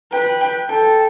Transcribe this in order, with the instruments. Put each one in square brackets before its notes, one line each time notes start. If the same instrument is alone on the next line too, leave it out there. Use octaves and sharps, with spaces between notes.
[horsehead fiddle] B4 [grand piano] G5
[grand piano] G5
[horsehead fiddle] A4 [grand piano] G5